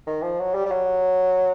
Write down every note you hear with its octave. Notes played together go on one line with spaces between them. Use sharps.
D#3
F3
F#3
G3
G3
F#3